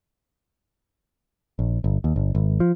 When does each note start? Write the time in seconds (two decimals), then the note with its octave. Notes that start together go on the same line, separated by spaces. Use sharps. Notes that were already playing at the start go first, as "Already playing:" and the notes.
1.59 A#1
1.84 G1
2.04 D#2
2.16 G1
2.35 G#1
2.60 F3